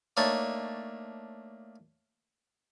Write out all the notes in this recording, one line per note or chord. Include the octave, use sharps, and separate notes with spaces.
A3 A#3 D4 D#4 C#5 A5